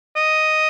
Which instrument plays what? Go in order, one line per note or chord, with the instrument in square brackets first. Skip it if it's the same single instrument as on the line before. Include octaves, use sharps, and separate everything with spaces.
[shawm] D#5